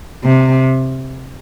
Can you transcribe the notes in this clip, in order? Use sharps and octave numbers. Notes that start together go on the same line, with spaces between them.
C3